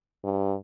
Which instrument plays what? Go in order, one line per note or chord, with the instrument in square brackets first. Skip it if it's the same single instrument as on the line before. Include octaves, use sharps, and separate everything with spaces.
[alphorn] G2